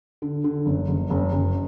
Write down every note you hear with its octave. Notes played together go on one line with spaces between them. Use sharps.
D3
D3
F#1
F#1
F#1
F#1